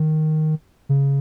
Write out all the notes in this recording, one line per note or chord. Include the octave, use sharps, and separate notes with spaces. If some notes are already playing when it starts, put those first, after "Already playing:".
Already playing: D#3
C#3